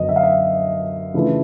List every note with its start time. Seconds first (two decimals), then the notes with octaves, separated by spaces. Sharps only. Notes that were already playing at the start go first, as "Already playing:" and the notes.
Already playing: F#2 D3 F#3 B3 D4 D#5
0.09 E5
0.16 F5
0.23 E5
1.14 C#3 E3 A3 D4 F4